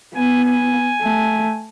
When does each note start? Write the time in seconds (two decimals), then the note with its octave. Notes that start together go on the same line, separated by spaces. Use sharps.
0.15 B3 G#5
0.44 G#5
1.02 A3